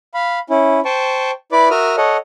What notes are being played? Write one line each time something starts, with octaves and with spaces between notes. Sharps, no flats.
F5 B5
C#4 E4
C5 G5 A5 C#6
E4 B4 D5 B5 D6
F#4 A#4 E5 D#6 F6
A4 C#5 D#5 F#5